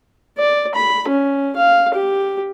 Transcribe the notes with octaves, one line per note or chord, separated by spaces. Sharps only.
D5
B5
C#4
F5
G4